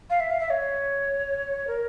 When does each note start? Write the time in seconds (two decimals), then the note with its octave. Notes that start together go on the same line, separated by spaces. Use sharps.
0.10 F5
0.20 E5
0.30 F5
0.40 E5
0.50 C#5
1.67 A#4